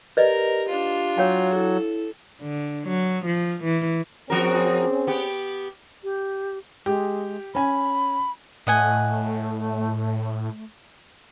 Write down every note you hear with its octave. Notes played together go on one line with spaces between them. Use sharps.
G4 A#4 B4 D5 D#5
D4 F4
F#3 C#5 F5 G5
E4 A4
D3
F#3
F3
E3
F3 C4 C#4 F#4 G#4 A#4
B3 G4
G4
G#3 G4
C#4 G#5 B5
A2 A3 D#5 F#5 G#5